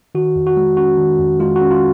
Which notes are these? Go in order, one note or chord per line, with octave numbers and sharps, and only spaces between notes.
D#3 F#4
F2
F#4
G#3
C#4 F#4
D#3
F2
G#3 F4
F#4
C#4
F4